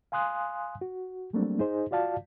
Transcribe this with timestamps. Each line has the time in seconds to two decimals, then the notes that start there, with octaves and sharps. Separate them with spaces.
0.12 F5 G#5 C6 D#6 F#6
0.81 F#4
1.33 F#3 G3 A3 A#3 C4 D4
1.59 D#4 G#4 C5 D#5
1.91 F4 F#4 D5 F5 A5